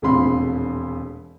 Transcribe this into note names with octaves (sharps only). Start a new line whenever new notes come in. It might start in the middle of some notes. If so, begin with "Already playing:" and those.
E1 A#1 F2 A3 B5 C6